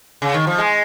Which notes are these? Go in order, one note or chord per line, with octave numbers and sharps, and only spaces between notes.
C#3
D#3
F3
G#3